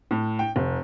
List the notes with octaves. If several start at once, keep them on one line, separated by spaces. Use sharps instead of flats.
A2
G5
F1